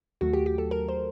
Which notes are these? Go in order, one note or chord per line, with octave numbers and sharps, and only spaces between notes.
D#2 D#3 F#3 A3 F#4
G4
G4
A4
A#4
C5